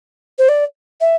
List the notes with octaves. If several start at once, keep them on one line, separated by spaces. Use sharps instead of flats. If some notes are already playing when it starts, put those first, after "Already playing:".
C5
D5
E5